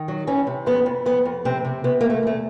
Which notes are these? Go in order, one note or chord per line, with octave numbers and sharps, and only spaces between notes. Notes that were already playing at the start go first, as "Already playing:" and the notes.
Already playing: D#3
F#3
E3 C#4
C3
F2 B3
F2
F2 B3
F2
C3 C4
C3
C3 B3
E2 A#3
A3
E2 A3